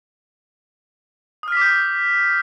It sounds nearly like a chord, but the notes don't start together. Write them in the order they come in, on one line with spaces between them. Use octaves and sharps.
D#6 F6 B6 D6 G6